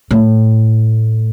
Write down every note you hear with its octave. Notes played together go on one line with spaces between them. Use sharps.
A2